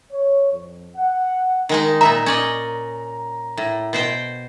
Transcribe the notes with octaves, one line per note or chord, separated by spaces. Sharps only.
C#5
F2
F#5
D#3 G#3 D#4
A#2 D#4 E5 A#5
C#4 D5 D#5
A2
B2 C5 G5